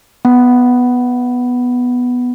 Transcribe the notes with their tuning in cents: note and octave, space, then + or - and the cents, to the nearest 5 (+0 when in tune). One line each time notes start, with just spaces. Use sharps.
B3 +0 F#5 +15 B5 +0